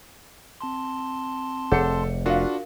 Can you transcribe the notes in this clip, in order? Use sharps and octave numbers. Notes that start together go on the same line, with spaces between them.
C4 A5 C6
F1 G#4 A4 C#5 F#5 C#7
D4 F4 F#4 A#4 F5